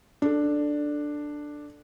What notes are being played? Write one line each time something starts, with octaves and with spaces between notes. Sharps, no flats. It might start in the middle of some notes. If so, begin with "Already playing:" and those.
D4 A4